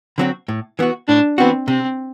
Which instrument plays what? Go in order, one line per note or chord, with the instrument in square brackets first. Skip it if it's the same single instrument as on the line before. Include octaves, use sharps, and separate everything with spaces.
[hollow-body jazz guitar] D3 F#3 C4 F#4
A2
E3 B3 F#4
[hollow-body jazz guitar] A2 [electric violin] D4
[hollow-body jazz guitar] E3 B3 F#4 [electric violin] C4
[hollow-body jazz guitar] C3 [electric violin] C4